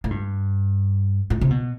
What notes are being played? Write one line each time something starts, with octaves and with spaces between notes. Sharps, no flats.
A2
G2
A2
C3
B2